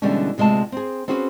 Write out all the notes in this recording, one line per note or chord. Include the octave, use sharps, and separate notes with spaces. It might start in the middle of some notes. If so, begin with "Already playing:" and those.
B2 D3 E3 G3 G#3 C#4
D2 C3 G#3 A3 F4 A5
C4 G#4
C4 C#4 F#4 G#4 A4 B4